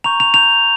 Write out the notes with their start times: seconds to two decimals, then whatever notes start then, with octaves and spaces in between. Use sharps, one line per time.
0.04 A#5 C#6 G6 F7
0.20 F7
0.34 A#5 C#6 G6 F7